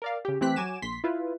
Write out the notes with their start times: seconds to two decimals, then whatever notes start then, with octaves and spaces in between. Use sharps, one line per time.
0.02 A#4 D5 F5
0.25 C#3 G4
0.41 E3 A3 C4 G4 F#6 B6
0.56 F#3 F#4 G#5 D6 E7
0.82 A#1 C6 B6
1.04 E4 F4 B4